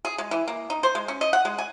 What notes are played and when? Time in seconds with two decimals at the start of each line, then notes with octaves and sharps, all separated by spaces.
0.05 G#4
0.18 G#3
0.31 E3
0.48 A#3
0.70 D#4
0.83 C5
0.95 G#3
1.08 C#4
1.21 D#5
1.33 F#5
1.45 G#3
1.58 G#5